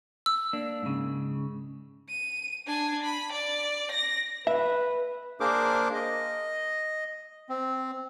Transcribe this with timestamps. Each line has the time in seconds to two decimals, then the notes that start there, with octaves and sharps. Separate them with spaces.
0.26 E6
0.53 A#3 D4
0.82 G#2 C#3
2.09 D#7
2.66 D4 G#5
3.03 B5
3.32 D5
3.92 A#6
4.47 B4 E5
5.40 A#3 D4 G#4 A#4 C5 D6
5.94 D#5
7.49 C4